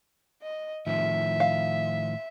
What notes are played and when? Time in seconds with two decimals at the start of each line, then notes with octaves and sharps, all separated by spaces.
0.42 D#5
0.87 A2 D#3 F3 E5
1.40 F5